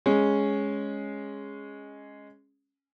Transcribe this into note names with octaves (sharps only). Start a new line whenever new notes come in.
G#3 C#4